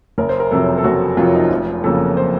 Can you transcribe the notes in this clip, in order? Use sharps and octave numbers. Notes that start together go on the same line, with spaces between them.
F#1 A#4
C5
A#4
F2 C3 F#3 A4
A4
F#1 F#4
F2 C3 F#3 F4
D#4
F1 F4
F2 C#3 F#3 A#3 A4
C5